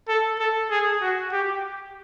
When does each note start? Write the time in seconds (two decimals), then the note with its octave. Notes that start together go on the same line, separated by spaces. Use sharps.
0.09 A4
0.39 A4
0.70 G#4
1.02 F#4
1.32 G4